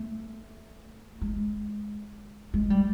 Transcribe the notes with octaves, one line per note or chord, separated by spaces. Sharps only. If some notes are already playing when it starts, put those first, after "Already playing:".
Already playing: A3
G#3
G#3
G3